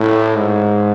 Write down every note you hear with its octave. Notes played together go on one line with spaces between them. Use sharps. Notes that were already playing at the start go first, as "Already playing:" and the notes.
Already playing: A2
G#2